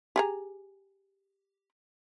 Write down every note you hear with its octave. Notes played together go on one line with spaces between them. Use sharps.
G4 G#4 A#5